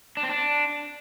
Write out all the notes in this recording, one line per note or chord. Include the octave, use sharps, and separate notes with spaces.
D4
C4
D4